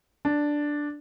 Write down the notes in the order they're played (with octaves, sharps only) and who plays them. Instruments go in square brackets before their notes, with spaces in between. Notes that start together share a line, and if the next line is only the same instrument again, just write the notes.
[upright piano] D4